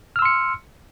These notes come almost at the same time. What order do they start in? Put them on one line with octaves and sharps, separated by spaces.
F6 E6 C6 C#7